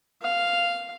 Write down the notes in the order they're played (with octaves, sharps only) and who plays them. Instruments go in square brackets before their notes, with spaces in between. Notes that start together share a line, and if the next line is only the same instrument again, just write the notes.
[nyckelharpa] F5